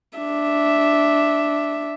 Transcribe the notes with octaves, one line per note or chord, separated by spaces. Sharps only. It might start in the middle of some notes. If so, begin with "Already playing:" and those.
D4 E5